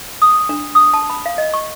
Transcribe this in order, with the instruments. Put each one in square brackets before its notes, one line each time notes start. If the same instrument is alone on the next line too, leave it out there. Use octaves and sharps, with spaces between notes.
[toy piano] D#6
D4
D#6
A5
B5
F5
D#5
C#6